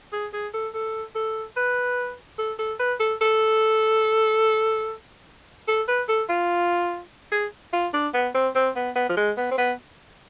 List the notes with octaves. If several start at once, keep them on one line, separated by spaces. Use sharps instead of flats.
G#4
G#4
A4
A4
A4
B4
A4
A4
B4
A4
A4
A4
B4
A4
F4
G#4
F4
D4
B3
C4
C4
B3
B3
F3
G#3
B3
C4
B3